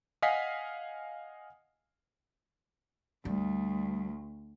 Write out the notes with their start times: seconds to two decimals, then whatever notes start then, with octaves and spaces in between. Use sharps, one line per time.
0.22 D#5 F5 F#5 G#5 B6 C7
3.25 D2 G3